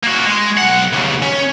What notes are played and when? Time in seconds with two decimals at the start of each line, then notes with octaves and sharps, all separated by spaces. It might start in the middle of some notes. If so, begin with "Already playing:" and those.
0.03 A#3 F#4
0.26 G#3
0.57 B1 F#5
0.93 D#2 C#3
1.22 C#4